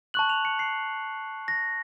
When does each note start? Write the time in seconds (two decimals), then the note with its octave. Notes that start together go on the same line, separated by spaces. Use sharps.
0.14 A5 C#6 F#6 F#7
0.29 F7
0.45 C#7
0.59 C7
1.48 A#6